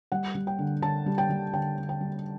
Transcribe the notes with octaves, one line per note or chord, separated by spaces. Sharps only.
G3 F#5
G3
G5
D3
D3 A5
G3
G5
G3
D3 G5
D3
G5
G3